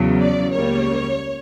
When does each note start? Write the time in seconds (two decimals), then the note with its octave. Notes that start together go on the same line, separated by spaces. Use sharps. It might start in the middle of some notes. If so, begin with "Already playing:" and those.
Already playing: E2 C#3 F#3
0.21 D5
0.52 C#2 C#3 G3 A#3 C#5